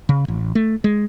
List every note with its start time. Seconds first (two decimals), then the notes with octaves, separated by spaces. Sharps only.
0.09 C#3
0.28 A1
0.55 A3
0.84 G#3